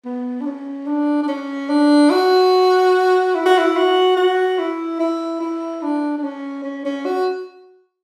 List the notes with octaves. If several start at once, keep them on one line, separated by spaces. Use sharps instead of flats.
B3
D4
C#4
D4
D4
C#4
D4
F#4
E4
F#4
E4
F#4
F#4
E4
E4
E4
D4
D4
C#4
C#4
C#4
F#4